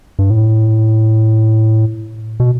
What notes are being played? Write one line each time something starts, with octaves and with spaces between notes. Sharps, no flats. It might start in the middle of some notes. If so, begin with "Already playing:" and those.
G2
A2
B2